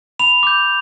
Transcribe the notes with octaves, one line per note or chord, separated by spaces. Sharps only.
B5 F7
D6 G6